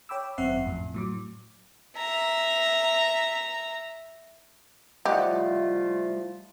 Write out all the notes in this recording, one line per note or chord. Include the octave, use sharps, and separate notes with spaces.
C#5 G5 B5 D6 E6
G#1 F#2 C4 E5 F#5 C7
F2 A2
A2 F#3 D6
E5 A#5
F3 G3 A3 E4 F4 G4 D#5 F#5